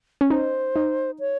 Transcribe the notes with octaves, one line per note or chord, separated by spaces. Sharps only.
C#4
D#4 C5
D#4
C#5